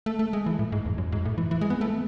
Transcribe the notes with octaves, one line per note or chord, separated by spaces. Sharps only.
A3
A3
G#3
E3
A2
G#2
E2
F#2
G#2
A2
E3
E3
G#3
B3
A3